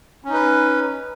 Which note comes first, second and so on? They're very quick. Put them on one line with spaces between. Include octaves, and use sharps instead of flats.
C#4 D#4 B4